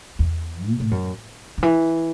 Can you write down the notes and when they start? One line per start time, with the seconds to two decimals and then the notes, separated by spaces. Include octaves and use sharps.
0.19 E2
0.68 B2
0.80 A2
0.91 F#2
1.58 D3
1.63 E3